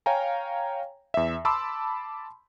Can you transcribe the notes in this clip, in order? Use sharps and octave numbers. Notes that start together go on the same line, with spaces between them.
C#5 F5 G5 G#5 A#5
E2 E5
A5 B5 C6 D6 E6